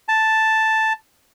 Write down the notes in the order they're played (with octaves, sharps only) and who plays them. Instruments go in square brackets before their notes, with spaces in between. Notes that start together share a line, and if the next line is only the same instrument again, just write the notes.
[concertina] A5